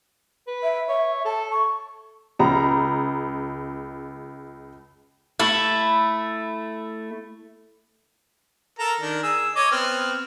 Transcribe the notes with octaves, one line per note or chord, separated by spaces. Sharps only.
B4
E5
C#5 E5
A4 A5
C#6
C#2 A#5
A3 E4
A4 A#4 A#5
D#3 D4 A#4
G#4 E6
C#5 D#5 D6
B3 C4 F6